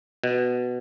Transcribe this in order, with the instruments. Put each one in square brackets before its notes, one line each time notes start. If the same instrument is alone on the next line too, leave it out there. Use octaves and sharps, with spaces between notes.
[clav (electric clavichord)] B2